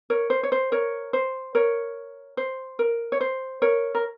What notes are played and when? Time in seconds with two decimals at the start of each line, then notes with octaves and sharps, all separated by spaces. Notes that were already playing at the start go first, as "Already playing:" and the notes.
0.10 A#4 C#5
0.30 C5
0.43 C#5
0.52 C5
0.72 A#4 C#5
1.13 C5
1.55 A#4 C#5
2.37 C5
2.79 A#4
3.12 C#5
3.21 C5
3.62 A#4 C#5
3.95 A#4